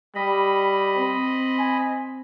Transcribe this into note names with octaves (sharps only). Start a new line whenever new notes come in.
G3 D#5 B5
C4
G#5